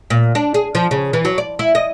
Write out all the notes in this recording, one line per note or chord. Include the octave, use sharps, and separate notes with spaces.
A#2
D4
G#4
F3
C#3
E3
F#3
D5
E4
D#5